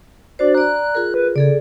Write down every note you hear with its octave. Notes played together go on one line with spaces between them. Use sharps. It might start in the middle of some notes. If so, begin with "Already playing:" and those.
D4 F#4 C5 D5
D5 A#5 F#6
F4 G#4 A#4
B4
C#3 G#4 A4 D5